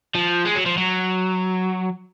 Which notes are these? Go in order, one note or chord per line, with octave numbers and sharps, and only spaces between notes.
F3
G#3
F#3
F3
F#3